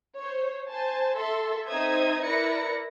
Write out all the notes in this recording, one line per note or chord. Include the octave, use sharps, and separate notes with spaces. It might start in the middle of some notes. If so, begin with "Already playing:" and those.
C5 C#5
C5 G#5 A5
A4 E5 C6
C4 D#4 C5 E5 D#6 G#6
E4 A#4 B4 D5 A#6 C#7